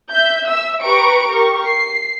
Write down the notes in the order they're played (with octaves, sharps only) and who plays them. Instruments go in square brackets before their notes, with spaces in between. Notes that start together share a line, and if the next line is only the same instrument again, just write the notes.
[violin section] E5 G6
E5 E6
G4 B4 A#5 C#6 D7
G4 A#4 C#6
C7